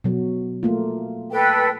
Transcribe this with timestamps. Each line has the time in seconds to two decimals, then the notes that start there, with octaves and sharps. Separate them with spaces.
0.04 B2 F#3
0.63 A3 A#3 F4
1.31 A4 B4 G5